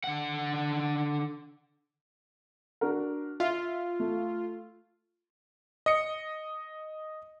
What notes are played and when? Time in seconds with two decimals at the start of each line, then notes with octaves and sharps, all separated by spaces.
0.04 D3 F#5
2.81 D4 F#4 A#4
3.40 F4 E5
4.00 A3
5.86 D#5 D#6 C#7